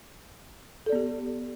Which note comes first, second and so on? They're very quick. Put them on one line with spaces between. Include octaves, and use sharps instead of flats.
A4 D5 B3 G4